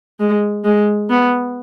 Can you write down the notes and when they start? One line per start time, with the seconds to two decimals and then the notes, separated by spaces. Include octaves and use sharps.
0.19 G#3
0.65 G#3
1.10 B3